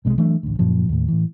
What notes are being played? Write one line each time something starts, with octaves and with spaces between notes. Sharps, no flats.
B1 C3 G#3
E3 F#3 A3 D4
A1 D2
F#2 A#2 F3
D#2 A2
A2 E3